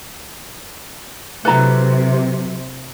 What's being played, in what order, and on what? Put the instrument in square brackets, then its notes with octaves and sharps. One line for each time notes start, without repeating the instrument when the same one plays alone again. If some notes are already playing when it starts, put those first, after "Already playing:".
[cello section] C3 [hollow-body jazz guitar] F#3 E4 A4 [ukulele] B4 A#5